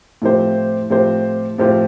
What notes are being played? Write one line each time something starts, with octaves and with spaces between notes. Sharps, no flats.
A2 F3 C4 G4 C5
A2 F3 C4 G4 C5
A2 F3 C4 G4 C5